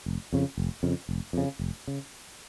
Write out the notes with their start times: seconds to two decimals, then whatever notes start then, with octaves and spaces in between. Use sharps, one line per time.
0.06 F1
0.33 F2 C#3
0.57 F1
0.83 F2 C#3
1.09 F1
1.33 F2 C#3
1.59 F1
1.87 C#3